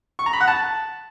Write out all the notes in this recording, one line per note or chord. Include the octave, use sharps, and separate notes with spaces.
C#6
A#5
B5
F#5
A5